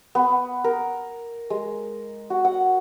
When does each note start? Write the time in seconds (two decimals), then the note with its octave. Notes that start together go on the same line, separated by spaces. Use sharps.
0.15 B3
0.64 A#4
1.50 G#3
2.30 F#4
2.45 F#5